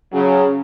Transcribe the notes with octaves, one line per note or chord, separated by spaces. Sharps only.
C#3 F#3